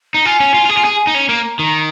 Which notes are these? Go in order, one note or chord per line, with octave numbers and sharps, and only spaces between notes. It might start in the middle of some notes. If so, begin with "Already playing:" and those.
D#4
F4 G#5
C#4
F4
F4
G#4
F4
G#4
D#4
C#4 A#5
A#3
D#3